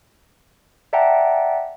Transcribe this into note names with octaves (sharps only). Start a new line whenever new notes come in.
D5 E5 F#5 G5 A5 A#5